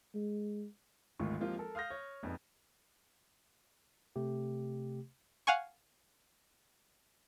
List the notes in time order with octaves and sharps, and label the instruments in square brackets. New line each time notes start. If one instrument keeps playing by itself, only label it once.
[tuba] G#3
[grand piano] G#1 D2 D#3 F4 C#6
F3 G#3 A#3 C4 F4 G4
A4 A#4
F5 D#6 F6 G6 A#6
C#5
A#1 F2 D#4 B4
[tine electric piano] C3 A3 G4
[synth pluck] F5 F#5 G#5 C#6